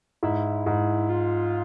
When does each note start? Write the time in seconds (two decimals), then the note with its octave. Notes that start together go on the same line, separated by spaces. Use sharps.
0.23 G#2 E4
0.66 G#2
1.09 F4